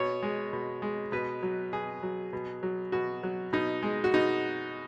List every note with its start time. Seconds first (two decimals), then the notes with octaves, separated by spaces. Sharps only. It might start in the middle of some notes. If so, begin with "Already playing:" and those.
Already playing: B2 C#5
0.22 G#3
0.53 B2
0.82 G#3
1.12 B2 B4
1.43 F#3
1.73 B2 G#4
2.03 F#3
2.33 B2
2.63 F#3
2.92 B2 F#4
3.23 F#3
3.53 B2 D#4
3.83 G#3
4.04 F#4
4.14 B2 D#4